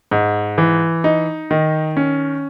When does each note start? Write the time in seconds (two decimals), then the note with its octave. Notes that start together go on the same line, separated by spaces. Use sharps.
0.11 G#2
0.58 E3
1.04 D#4
1.51 D#3
1.97 C#4